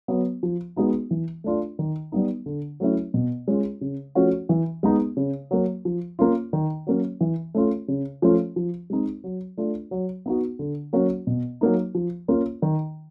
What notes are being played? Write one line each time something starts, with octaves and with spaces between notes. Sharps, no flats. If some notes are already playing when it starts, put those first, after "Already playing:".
F#3 B3
F3
G#3 B3 D#4 F#4
E3
A3 D4 F4
D#3
G3 B3 D#4
D3
F#3 A3 C#4 E4
B2
G#3 C#4 F4
C#3
F3 A3 C#4 F#4
E3
G#3 B3 D#4
C#3
F#3 A#3
F3
A#3 C#4 F4
D#3
F#3 A#3 C#4
E3
A3 C#4 F4
C#3
F3 A3 C#4 F4
F3
G#3 C4 D#4
F#3
A3 D4 F4
F#3
B3 D#4 F#4
D3
F#3 A#3 C#4 F#4
B2
F#3 A#3 D#4
F3
A#3 C#4 F4
D#3